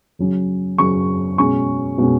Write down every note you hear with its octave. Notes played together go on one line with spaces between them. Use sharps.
C#3 F#3 C#4
C#3 F#3 C#4 C#6
B2 G#3 C#4 C#6
B2 G#3 C#4